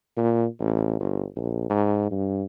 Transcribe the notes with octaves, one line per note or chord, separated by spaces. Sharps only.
A#2
A1
G1
A#1
G#2
G2